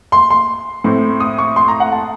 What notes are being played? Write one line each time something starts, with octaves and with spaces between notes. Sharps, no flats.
C6
C6
A2 A3 C4
D#6
C#6
C6
A#5
F#5
A5